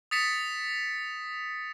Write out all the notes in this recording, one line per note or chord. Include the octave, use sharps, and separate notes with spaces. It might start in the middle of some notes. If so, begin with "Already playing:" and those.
D#6 A6 B6 C#7 E7